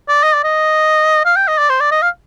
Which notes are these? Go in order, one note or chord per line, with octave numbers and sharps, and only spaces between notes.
D5
D#5
D5
D#5
F5
G5
D#5
D5
C5
D5
D#5
F5